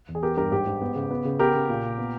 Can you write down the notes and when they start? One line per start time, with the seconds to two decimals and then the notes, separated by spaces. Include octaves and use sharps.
0.08 E2
0.15 G#4
0.23 B3 G4 A#4
0.37 G2 G4 A#4
0.52 G#2 G4
0.67 G#2
0.81 B3
0.95 C#3
1.11 B3
1.25 C#3
1.39 B3 G4 A#4
1.55 C#3
1.69 A#2
1.84 A#2
1.98 B3